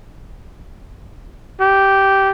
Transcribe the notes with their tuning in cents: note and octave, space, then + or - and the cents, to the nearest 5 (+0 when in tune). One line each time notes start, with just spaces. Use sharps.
G4 -10